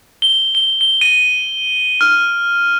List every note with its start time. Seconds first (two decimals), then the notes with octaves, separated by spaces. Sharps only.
0.22 G7
0.55 G7
0.81 G7
1.01 D#7
2.01 F6